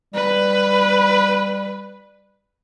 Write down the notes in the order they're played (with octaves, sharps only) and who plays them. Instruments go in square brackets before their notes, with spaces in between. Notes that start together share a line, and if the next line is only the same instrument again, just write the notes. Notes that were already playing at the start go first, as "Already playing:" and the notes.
[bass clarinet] G3 [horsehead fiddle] B4